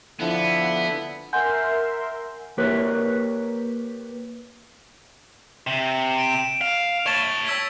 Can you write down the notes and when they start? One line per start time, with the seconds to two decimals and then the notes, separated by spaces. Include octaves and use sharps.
0.20 D3 F3 B3 E4
1.33 A#4 E5 F#5 G#5 C6 G6
2.58 A#3 G4 A#4 B4 C#5
5.67 C3
6.18 D7 E7
6.61 F5
7.06 C#5 A5 C#6 A6
7.46 E6 G#6 B6